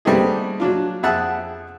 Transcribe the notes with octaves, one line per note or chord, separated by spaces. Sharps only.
G3 A3 B3 C4 D#4 G#4
F#3 D4 F4
F2 G#4 E5 F#5 A5